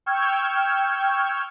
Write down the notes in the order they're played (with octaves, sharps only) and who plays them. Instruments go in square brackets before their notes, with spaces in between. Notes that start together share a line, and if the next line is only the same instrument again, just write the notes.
[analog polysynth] G5 C#6 E6 F6 G6 G#6